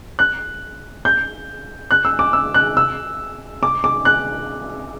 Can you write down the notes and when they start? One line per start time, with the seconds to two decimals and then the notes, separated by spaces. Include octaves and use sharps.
0.19 F#6
1.05 G6
1.91 F#6
2.05 E6
2.19 D6
2.33 E6
2.54 F#6
2.77 E6
3.63 D6
3.84 D6
4.05 F#6